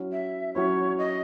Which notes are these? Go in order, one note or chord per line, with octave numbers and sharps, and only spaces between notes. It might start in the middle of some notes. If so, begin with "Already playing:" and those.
Already playing: F#3 C#4 E4
E5
F#3 C#4 E4 C#5
D#5